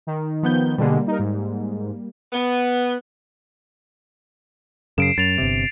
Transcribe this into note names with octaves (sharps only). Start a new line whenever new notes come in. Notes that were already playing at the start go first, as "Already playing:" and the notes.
D#3
F3 B3 G6
B2 D3 G3 G#3 A#3
D#4 A#4
G#2
B3
F#2 C#3 C7 D7 E7
F#2 A6 F7
G1 C3